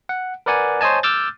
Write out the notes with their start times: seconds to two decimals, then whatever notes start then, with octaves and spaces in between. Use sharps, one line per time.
0.09 F#5
0.46 A#4 B4 D5 F#5 G#5
0.81 C5 C#5 D#5 G#5 A5
1.03 D6 E6 F6 G6 A6